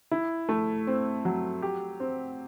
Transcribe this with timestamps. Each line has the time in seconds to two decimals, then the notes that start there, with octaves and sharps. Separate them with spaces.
0.11 E4
0.49 A3
0.87 C4
1.25 F#3
1.62 G4
2.00 C4